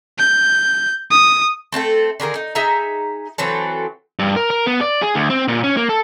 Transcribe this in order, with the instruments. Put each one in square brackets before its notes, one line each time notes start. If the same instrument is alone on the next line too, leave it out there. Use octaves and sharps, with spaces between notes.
[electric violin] G6
D#6
[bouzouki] A3 C4 F4 A4
D3 D#3 G#4 A#4
D#4
D#4 G#4 E5 A#5
E3 F#3 C4 A4
[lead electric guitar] G2
A#4
A#4
B3
D5
G#4
D2
C4
A#2
C#4
A#3
A4